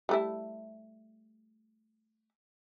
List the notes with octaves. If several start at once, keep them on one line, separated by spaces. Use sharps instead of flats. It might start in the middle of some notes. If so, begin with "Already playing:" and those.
G3 A3 E4